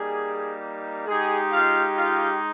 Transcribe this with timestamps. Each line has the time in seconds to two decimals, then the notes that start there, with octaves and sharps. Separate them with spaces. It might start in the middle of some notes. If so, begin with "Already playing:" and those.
Already playing: G3 A#3 D#4 G#4
1.06 G#3 D#4 G4 G#4
1.52 F4 F5
1.97 F4 F5